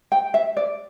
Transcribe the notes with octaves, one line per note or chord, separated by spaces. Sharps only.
G5
E5
D5